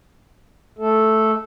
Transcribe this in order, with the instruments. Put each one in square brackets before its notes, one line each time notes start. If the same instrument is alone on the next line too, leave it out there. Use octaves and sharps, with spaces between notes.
[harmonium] A3 A4